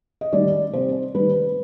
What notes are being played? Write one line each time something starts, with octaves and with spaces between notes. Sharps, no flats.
D#5
D#3 G3 D5
C3 C5
D#3 G3 B4